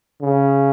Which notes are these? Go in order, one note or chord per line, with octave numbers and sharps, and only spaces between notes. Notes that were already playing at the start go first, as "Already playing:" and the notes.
C#3